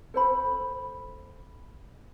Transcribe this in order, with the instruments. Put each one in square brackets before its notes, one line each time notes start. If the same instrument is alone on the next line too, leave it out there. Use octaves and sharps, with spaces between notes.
[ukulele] A4 C5 B5